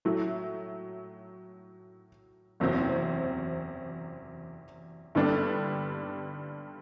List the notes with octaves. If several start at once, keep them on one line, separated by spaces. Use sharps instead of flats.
A2 F#3 A3
F#1 E2 C3 F#3 C4
G2 D3 G3 B3 D4